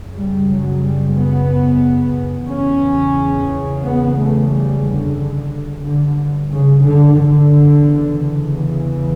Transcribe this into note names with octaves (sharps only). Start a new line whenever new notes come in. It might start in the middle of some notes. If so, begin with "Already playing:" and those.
Already playing: F#2 C#3
G3
F#3
G3
B3
E2 C#3 C#4
B3
A3
G3
D3
G2
D3
C#3
D3
D3
E2 C#3
E3